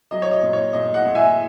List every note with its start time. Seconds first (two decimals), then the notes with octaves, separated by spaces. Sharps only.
0.11 F#3 D#5
0.22 C#5
0.31 D#5
0.43 A#2
0.53 C#5
0.73 A#2 D#5
0.94 D#5 F#5
1.05 A#2
1.15 E5 G#5